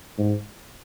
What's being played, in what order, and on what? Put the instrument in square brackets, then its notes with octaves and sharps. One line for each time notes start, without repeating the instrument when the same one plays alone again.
[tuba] G#2